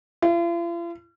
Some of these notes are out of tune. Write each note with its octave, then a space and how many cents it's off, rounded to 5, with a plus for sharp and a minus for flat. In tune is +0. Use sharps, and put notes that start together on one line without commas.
F4 -45